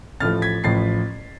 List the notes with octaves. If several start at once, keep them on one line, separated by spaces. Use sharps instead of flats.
A1 A2 F3 A3 F6 A6
G#6 B6
A1 A2 F3 A3 A6 C7